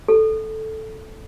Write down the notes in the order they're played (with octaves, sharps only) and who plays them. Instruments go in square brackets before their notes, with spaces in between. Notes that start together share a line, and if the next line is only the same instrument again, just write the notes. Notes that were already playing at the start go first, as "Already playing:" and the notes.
[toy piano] A4